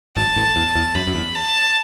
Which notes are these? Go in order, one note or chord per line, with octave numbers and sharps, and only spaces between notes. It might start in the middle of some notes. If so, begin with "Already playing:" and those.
G#1 G#2 A5
A1 A2
E2
E2
F#2 B5
F#2
E2
A5